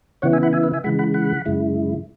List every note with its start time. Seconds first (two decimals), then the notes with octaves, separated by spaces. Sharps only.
0.22 C#3 E3 B3 E4 C#5 F#5
0.33 E5 G#5
0.43 F#5 B5
0.53 E5 G#5
0.63 B4 E5
0.73 E5 G#5
0.84 C#3 E3 G#3 F#5 B5
0.99 F#5 B5
1.14 F#5 B5
1.46 F#2 C#3 G#3 E4